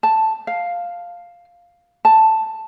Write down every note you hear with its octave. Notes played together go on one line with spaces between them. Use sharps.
A5
F5
A5